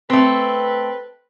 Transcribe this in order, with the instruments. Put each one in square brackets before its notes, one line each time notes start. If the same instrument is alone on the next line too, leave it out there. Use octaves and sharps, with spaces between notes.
[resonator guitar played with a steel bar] A3 C4 [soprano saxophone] B4